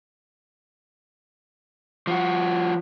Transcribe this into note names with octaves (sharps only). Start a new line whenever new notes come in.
F3 F#4